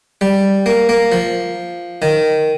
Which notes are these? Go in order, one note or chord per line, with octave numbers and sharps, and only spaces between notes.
G3
A#3
A#3
F3
D#3